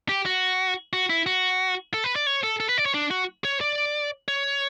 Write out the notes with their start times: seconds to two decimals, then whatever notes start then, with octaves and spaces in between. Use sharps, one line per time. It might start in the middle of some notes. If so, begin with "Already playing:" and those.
0.09 G4
0.26 F#4
0.93 F#4
1.10 E4
1.26 F#4
1.94 A4
2.04 B4
2.16 D5
2.27 C#5
2.43 A4
2.60 A4
2.69 B4
2.78 D5
2.86 C#5
2.94 D4
3.11 F#4
3.45 C#5
3.61 D5
4.28 C#5